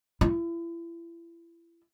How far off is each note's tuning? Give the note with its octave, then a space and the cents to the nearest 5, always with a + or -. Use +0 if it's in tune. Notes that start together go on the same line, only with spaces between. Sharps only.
E4 +35